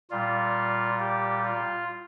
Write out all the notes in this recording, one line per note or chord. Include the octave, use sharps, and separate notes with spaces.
A#2 G3 F4
G4
F4